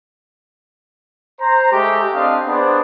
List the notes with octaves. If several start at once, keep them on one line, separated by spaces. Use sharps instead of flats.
C5 A#5
G#3 A3 G4
C4 D4 D#5 F5
B3 D4 G#4 C5